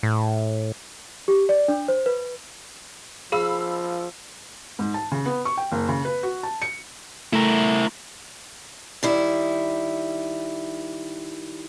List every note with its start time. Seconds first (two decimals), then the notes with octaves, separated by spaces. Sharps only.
0.03 A2
1.28 G4
1.49 D5
1.68 D4
1.88 C5
2.06 B4
3.32 F3 G#4 F5 B5 E6
4.79 G#2
4.94 A5
5.12 C#3
5.26 B3
5.45 C#6
5.57 G5
5.72 F#1
5.89 C#3
6.05 B4
6.23 F#4
6.43 A5
6.62 C#7
7.33 A3 E4 A#4
9.03 D#3 G3 E4